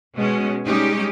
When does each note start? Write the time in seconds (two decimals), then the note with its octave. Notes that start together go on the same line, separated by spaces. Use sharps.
0.14 B2 G#3 C#4
0.67 G3 G#3 C#4 D#4 G4